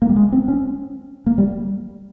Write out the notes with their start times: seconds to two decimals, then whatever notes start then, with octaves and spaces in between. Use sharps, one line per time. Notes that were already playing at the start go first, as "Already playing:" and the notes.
0.02 A#3
0.09 G3
0.16 G#3
0.32 C4
0.48 C#4
1.26 A#3
1.38 G3